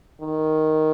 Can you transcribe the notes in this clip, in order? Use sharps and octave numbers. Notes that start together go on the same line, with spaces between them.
D#3